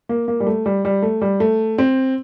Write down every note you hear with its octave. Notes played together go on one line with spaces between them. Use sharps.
A#3
A#3
G3
A3
G3
G3
A3
G3
A3
C4